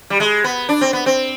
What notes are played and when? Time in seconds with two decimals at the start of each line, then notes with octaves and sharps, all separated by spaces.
0.10 G3
0.20 G#3
0.44 B3
0.69 D4
0.81 C4
0.93 B3
1.06 C4